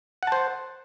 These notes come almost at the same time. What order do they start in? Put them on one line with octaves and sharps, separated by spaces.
F#5 A5 C5